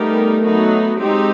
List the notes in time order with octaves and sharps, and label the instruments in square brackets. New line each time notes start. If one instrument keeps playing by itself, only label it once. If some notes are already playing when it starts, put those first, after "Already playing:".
Already playing: [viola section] G3 B3 D#4 G4 A#4 [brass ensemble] A3
[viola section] F#3 B3 D#4 F#4
[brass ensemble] G#3 [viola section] C4 D#4 G4